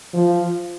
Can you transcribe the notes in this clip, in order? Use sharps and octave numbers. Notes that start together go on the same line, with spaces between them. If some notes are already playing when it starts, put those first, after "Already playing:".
F3